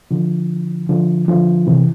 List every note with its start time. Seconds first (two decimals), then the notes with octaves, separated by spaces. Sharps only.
0.11 D3 F3
0.89 D3 F3
1.28 D3 F3
1.67 C3 E3